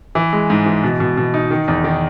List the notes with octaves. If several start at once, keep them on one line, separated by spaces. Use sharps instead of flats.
E3
G#3
G#2
E3
B2
B2
B2
D#4
D#3
E2
D#3